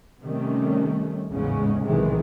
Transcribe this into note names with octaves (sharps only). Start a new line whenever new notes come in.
C3 D#3 G3 A3 C#4
A1 E2 G#2 C#3 G#3 C#4
B1 A2 C3 D#3 E3 G#3